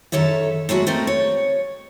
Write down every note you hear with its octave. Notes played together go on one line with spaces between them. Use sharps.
F#2 D#3 A4 C#5 E5
F#3 G#3 A3 F#4 E5
A3 C4 A4 A#4 D#5
C#5